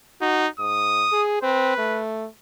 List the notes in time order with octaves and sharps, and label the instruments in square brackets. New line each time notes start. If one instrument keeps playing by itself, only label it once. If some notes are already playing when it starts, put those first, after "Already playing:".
[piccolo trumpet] D#4 [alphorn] F#4
[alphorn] G#2 [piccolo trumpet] D#6
[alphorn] G#4
[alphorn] C4 [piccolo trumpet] B4
[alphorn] A3